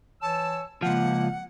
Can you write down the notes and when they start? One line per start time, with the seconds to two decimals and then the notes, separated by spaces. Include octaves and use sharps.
0.22 E3 C#5 A5 E6
0.82 C#2 F3 A#3 F#5